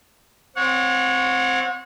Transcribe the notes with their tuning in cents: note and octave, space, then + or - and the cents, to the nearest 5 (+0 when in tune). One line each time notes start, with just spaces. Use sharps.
C4 +0 C#5 +0 F#5 -35